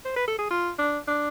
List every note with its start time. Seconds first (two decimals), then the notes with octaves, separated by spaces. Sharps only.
0.05 C5
0.16 B4
0.28 A4
0.39 G#4
0.50 F4
0.79 D4
1.08 D4